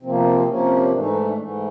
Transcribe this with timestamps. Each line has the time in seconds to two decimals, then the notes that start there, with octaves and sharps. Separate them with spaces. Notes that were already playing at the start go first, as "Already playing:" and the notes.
0.02 C3 F3 A#3 C4
0.12 B3
0.20 C4
0.47 C3 F3 A#3 C#4
0.92 G#2 E3 A3 D4
1.03 D#4
1.14 D#4
1.25 D4
1.36 G#2 E3 A3